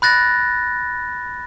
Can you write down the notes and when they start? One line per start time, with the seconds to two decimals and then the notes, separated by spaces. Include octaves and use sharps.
0.02 B5 F#6 A6 A#6